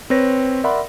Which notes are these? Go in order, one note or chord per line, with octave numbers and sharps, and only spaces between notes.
C4 B4 C#5 A#6
A#4 D5 E5 F#5 B5 C6